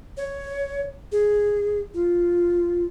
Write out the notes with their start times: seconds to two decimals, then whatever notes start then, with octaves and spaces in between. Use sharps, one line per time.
0.17 C#5
1.12 G#4
1.94 F4